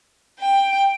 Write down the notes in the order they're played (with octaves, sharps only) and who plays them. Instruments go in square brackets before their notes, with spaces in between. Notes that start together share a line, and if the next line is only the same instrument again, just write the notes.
[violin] G5